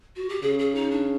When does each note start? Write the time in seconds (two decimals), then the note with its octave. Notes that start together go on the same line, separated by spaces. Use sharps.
0.16 F#4
0.29 G4
0.42 C#3 G#4
0.59 G#4
0.75 D#4
0.91 D4